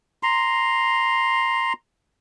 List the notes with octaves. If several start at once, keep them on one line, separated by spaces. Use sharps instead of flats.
A#5 C6